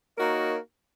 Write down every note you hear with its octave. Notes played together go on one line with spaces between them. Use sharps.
A#3 D#4 F#4 A#4 C#5